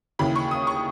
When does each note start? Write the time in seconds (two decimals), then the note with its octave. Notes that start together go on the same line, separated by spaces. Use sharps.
0.19 D#2 C#3 E3 B5
0.36 C#6
0.51 D#6
0.67 C#6